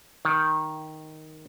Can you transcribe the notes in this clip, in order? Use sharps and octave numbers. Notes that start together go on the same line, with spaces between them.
D#3